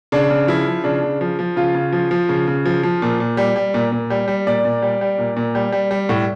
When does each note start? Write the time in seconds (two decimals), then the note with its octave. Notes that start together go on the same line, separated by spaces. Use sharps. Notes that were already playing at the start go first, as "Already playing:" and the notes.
0.12 C#3 D4
0.30 C#3
0.48 F3 E4
0.67 F3
0.84 C#3 D4
1.03 C#3
1.21 F3
1.39 F3
1.56 C#3 F4
1.74 C#3
1.93 F3
2.11 F3
2.29 C#3
2.48 C#3
2.66 F3
2.83 F3
3.02 A#2
3.20 A#2
3.37 G3
3.56 G3
3.74 A#2
3.92 A#2
4.10 G3
4.28 G3
4.47 A#2 D5
4.65 A#2
4.82 G3
5.01 G3
5.18 A#2
5.36 A#2
5.55 G3
5.72 G3
5.91 G3
6.09 A2